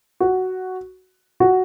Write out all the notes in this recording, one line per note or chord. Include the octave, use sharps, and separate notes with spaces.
F#4
F#4